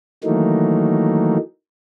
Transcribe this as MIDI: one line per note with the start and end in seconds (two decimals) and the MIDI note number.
0.24 1.37 51
0.24 1.37 52
0.24 1.37 54
0.24 1.37 57
0.24 1.37 58
0.24 1.37 63